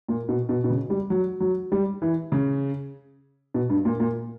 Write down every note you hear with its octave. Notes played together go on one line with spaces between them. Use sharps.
A#2
B2
B2
B2
C#3
G3
F#3
F#3
G3
E3
C#3
B2
G2
A#2
A#2